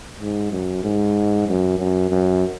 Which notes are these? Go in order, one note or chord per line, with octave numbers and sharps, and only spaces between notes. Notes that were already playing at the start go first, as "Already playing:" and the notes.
G#2
F#2
G#2
F#2
F#2
F#2